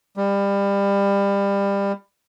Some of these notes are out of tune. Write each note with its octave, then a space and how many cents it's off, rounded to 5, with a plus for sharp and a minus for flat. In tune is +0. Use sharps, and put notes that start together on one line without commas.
G3 +25